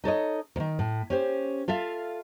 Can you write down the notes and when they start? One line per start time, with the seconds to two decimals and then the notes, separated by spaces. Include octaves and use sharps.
0.04 D#4 A4 C#5 D#5
0.56 D#2 D#3
0.79 A2
1.10 C#4 G4 C5
1.68 F4 A4 E5 F5